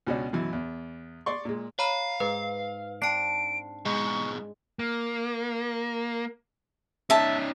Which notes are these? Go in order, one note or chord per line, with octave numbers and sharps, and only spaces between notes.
C#2 B2 C#4 D4
F#2 B2 E3
E2
D5 C6 C#6
A#2 G#3
C#5 F5 A#5 B5
G#2 B4
C4 D4 A5 C7 D7
G#2 B2 G#3 C#6
A#3
C#4 D#4 E5 A5